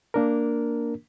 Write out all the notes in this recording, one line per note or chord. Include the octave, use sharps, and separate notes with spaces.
A#3 D4 A#4